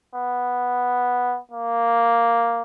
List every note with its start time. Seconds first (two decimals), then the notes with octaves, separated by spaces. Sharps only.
0.15 B3
1.52 A#3